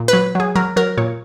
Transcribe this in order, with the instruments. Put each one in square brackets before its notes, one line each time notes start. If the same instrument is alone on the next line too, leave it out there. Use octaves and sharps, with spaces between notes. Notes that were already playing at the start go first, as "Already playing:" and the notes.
Already playing: [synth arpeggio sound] A#2
F#3 B4
F#3 G#4
F#3 A#4
F#3 A#4
A#2 C#5